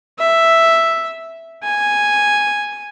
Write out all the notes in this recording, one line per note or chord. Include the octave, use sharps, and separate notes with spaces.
E5
G#5